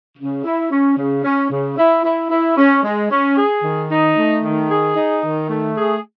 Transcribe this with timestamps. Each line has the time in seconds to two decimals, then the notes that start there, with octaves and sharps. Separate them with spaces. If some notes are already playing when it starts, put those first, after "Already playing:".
0.18 C#3
0.44 E4
0.71 C#4
0.97 C#3
1.24 C#4
1.50 C#3
1.77 E4
2.04 E4
2.31 E4
2.57 C#4
2.84 G#3
3.10 C#4
3.37 G#4
3.63 D#3
3.90 D#4
4.17 A3
4.44 D#3
4.70 G#4
4.96 D#4
5.23 D#3
5.50 A3
5.76 G#4